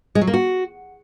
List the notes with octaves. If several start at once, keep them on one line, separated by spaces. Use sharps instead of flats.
G#3
F#3
A#3
F#4